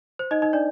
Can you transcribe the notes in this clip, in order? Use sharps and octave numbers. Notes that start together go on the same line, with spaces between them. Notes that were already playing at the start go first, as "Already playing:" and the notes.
C5
D#4 D#5
D#4 D#5
D4 D5